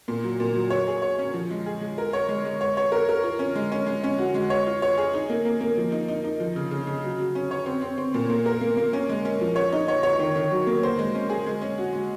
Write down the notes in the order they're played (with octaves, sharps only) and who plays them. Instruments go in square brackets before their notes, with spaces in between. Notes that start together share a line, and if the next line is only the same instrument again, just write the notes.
[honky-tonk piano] A#2
F#3
A#2
F#3
C#5
G#4
C#5
C#4
F3
G#3
G#4
G#3
A#4
C#5
G#3
G#3
C#5
C#5
A#4
A#4
F4
C#4
G#3
C#4
G#3
C#4
F#4
G#3
C#5
F4
C#5
G#4
D#4
A#3
A#3
A#3
F3
D#4
D#4
D#4
F3
C#3
C#3
C#3
F#3
F#3
C#4
C#5
C4
C4
C4
A#2
A#3
A#4
A#3
A#3
C#4
G#3
C#4
F3
C#5
D#4
C#5
C#5
D#3
D#3
F#3
A#3
C5
G#3
C#4
G#4
G#3
C#4
F#4
G#3